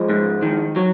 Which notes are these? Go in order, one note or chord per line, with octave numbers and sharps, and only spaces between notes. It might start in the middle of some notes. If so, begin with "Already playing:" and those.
Already playing: F3 G#3
G#2
D#3
F#3